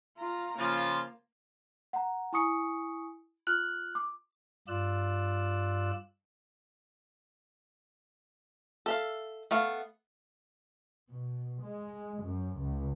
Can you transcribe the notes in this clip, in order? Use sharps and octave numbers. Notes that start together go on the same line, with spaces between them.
F4 A#5
C#3 F3 A#3 F4
F#5 A#5
E4 G#5 C#6 D#6 C#7
F4 F6 F#6 F#7
D6
G2 F4 D5 E6 F#6
A4 E5 F5
A3 B3 F5
B2
G#3
F#2
C#2